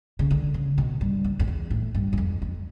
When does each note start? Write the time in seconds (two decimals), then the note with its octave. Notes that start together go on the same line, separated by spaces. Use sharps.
0.19 C#3
0.31 D3
0.54 C#3
0.78 B2
1.01 G2
1.24 F#2
1.39 F2
1.47 E2
1.70 A2
1.94 G2
2.13 F#2
2.18 F2
2.42 F2